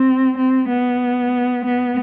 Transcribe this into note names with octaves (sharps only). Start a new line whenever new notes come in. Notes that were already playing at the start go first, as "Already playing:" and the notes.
Already playing: C4
C4
B3
B3